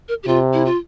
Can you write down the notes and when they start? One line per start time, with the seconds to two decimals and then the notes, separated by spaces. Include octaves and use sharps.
0.08 A#4
0.23 G4
0.27 C3 F4
0.53 E4
0.65 F4